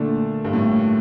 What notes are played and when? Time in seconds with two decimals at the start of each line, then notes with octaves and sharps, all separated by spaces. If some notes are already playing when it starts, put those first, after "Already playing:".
Already playing: A#2 D3 A3 D4
0.44 G2
0.53 A2